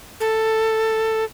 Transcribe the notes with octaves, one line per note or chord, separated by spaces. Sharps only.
A4